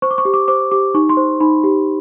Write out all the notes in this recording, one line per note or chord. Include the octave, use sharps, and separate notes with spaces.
C5 C#6
D6
C#6
G4
D6
C5 D6
G4 D6
D#4 C#6
C6
C5
D#4 B5
G4